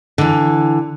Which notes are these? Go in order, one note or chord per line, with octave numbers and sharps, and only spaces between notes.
D3 E3